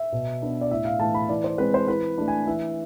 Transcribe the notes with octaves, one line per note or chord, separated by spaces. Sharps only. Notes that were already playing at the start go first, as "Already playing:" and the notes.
Already playing: E5
B2
B3 D4
D5
A2 E5
F5
E3 A3 A5
B5
E3 D5
C5
G#3 C4 B4
C5
E3 B4
A3 D4
G#5
E3 E5